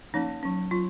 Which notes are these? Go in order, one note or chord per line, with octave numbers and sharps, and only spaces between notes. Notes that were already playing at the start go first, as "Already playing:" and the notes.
F3 A#3 C#4 D#4
F#3 C#4
F#3 F4